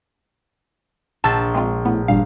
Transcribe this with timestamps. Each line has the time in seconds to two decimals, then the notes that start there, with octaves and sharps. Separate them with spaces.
1.24 A#1 A5 E6 A6
1.54 G#3 C4 F4
1.85 A2 B3
2.08 G#1 G2 A#2 F5